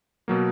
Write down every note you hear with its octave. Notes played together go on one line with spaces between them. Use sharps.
B2 F#3 A#3